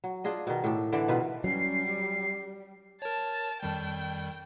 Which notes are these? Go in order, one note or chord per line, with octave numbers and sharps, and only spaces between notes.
F#3
D4 F4 G#4 D#5
B2 D#3
A2 G4 A4
D3 E3 D4 D5
B2 D#3 F4 B4
F#3 G3 C#4 C7
G4
A#4 C#5 A5
F2 D#3 G3 G5